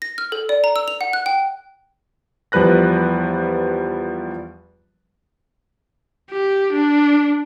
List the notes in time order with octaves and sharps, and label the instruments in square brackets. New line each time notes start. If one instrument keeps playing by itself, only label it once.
[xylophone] A#6
F6
A4
D5
A#5
E6
F7
F#5
F#6
G5
[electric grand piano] E2 F3 G3 B4 F#6 A#6
[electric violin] G4
D4